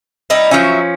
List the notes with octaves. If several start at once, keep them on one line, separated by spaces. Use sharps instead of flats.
G3 D#4 E4
F3 F#3 C#4 E5